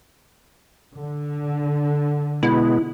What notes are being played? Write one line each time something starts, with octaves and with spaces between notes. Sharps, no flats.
D3
B2 G#3 B3 E4